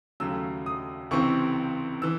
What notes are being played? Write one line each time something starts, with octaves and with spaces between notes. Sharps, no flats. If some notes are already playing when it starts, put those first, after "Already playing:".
D#2 C#3 F#3 A3 E6
D#6
C#2 C3 E3 C4 C#6
E3 E6